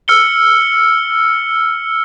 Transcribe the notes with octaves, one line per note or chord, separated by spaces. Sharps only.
E6 F6 C#7 G7